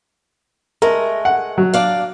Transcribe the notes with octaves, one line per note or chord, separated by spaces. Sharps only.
G#3 A3 A#4
F#5
F#3
D4 D5 F5